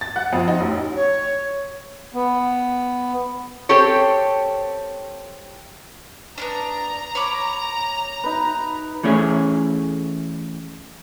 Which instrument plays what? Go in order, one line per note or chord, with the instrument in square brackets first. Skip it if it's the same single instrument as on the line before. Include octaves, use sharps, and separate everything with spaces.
[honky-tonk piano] A6
F#5
F2
D#4
A1
[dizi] C#5
[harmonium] B3
[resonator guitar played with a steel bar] C4 G4 A4 C#5
[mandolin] B3 C4 D4 [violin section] A#5
[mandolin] C#5 B5 D6
[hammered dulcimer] D#4 B4
[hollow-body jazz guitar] E3 A3 C#4 G#4 C#5